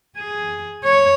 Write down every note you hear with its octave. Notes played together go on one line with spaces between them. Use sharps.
G#4
C#5